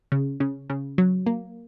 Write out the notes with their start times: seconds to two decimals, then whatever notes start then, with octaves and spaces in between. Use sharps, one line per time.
0.12 C#3
0.40 C#3
0.70 C#3
0.98 F#3
1.26 A#3